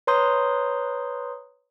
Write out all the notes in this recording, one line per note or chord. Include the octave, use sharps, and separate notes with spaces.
B4 C#5 A#5 C6 D#6 G6